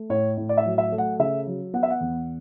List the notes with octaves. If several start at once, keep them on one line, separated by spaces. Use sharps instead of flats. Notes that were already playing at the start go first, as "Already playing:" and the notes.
Already playing: A3
A2 C#5
A2
D5
E5
F#3
E5
A3
F#5
C#3 E5
F#3
B3 F#5
E5
F#5
E2